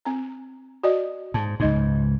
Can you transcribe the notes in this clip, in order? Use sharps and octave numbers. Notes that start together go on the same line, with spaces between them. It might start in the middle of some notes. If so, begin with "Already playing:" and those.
C4 A#5
F#4 D5 D#5
G#2 A5
C#2 G#2 D#4 D#5